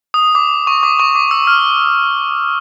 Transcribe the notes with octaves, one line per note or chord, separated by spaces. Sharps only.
D#6
D6
C#6
D6
C#6
D6
E6
F6